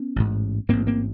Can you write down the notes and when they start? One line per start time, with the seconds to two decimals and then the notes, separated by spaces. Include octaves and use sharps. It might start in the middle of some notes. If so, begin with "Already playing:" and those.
Already playing: B3 C#4
0.16 A1 G#2
0.69 A1 G#2 A#3 C4
0.87 A#3 C4